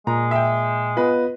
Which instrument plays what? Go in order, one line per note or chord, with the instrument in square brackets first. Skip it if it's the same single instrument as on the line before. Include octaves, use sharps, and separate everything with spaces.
[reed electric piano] A#2 [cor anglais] G#3 [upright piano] A#5
[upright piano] E5 G5
[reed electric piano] B3 F4 [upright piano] B4 D#5